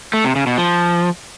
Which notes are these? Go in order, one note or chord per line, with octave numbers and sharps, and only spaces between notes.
A3
C3
C#3
B2
F3